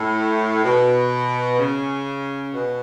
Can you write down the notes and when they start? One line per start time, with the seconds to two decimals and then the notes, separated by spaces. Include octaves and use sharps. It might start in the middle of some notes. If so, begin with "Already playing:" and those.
Already playing: A2
0.64 B2
1.58 C#3
2.52 B2